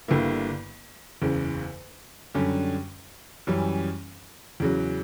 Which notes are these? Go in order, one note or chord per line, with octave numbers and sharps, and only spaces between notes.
G1 G2 D3 A#3 E4
F#1 E2 C#3
F#2 D3 G3 C#4 G4
F#2 E3 G3 C#4
E2 C#3 F#3